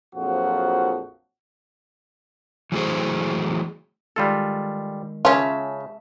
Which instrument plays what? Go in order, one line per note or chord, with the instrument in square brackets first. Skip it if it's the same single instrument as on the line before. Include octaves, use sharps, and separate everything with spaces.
[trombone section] A#1 F2 F3 F#3 F#4
[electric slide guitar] E3 F#3 A3 G#4 C5
[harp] D#3 G#3 [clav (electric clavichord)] G3 F4 A4
[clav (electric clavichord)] C#3 [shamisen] C#4 F4 [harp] E5 A5